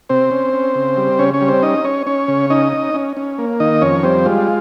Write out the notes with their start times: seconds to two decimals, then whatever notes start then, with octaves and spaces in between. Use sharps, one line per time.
0.09 C3 C4 C5
0.31 C#4
0.53 C#4
0.75 C#3
0.97 G3
1.19 C#3 C#4 C#5
1.34 C#4 C#5
1.41 G3
1.48 C4 C5
1.62 C#4 D#4 D#5
1.84 C#4 C#5
2.07 C#4 C#5
2.28 C#3
2.50 C#4 D#4 D#5
2.73 C#4
2.94 C#4
3.17 C#4
3.38 A#3
3.60 D#3 D#4 D#5
3.81 F2 C#4 C#5
4.03 G3 C4 C5
4.26 G#3 F4